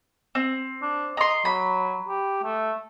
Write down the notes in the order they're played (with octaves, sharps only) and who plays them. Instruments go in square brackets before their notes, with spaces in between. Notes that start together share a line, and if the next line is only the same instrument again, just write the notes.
[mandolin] C4
[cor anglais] D4
[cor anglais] D#5 [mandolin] A#5 C6
[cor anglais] F#3 [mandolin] B5
[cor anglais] G4
A3